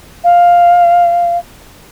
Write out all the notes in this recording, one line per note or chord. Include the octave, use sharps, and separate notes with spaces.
F5